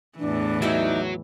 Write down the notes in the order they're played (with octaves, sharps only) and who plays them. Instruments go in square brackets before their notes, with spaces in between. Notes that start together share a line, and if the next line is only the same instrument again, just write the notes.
[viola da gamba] E2 A2 E3 [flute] D4
[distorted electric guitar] F#3 [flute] D#4 [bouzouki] E4 G4 D5